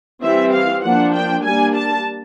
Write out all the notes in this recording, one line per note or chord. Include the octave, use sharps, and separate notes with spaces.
E3 G3 C4 E5
F5
F3 A#3 D4 F#5
G5
G3 A#3 D4 G#5
A5